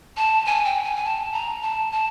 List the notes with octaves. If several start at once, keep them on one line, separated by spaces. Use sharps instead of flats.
A5
G#5
G5
G#5
G#5
A5
A#5
A5
A5